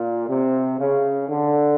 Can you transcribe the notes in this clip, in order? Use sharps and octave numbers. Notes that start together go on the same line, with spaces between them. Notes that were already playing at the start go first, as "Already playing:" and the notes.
Already playing: A#2
C3
C#3
D3